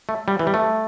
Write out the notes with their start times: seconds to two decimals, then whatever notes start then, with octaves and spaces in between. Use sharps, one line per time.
0.09 A3
0.28 G3
0.39 E3
0.47 G3
0.54 A3